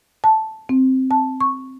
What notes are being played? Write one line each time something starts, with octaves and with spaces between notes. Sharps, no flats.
A5
C4
A5
C#6